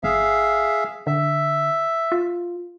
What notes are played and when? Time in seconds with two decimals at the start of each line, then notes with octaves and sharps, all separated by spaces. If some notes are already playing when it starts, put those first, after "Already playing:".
0.04 G1 G#4 E5 F5
1.07 D3 E5
2.12 F4